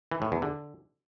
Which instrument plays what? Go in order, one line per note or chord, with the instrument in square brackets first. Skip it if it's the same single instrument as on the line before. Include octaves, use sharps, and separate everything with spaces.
[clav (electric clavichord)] E3
A2
E2
D3